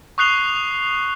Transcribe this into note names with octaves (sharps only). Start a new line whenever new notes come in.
C#6 D#6 F#6 C7 F7 G7